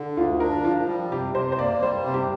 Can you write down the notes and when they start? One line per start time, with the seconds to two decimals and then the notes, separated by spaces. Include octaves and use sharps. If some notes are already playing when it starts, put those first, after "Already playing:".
Already playing: D3
0.17 D2 F4
0.40 D4 A#4
0.64 F3 F4
0.88 G3
1.11 C3 G4
1.35 C3 C5
1.52 C5
1.59 A#3 D5
1.82 G3 C5
2.06 C3
2.14 G4